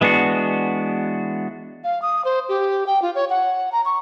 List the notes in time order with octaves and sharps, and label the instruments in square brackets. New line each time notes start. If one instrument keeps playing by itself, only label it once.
[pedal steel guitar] E3 G#3 B3 D4 F#4
[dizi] F5
D#6
C5
G4
G5
F4
C#5
F#5
A#5
C#6